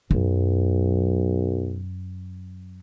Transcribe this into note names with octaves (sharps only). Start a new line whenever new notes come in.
B1 F#2